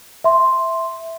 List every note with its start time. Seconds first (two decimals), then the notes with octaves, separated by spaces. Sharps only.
0.24 E5 C6